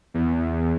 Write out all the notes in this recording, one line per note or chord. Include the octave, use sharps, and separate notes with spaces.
E2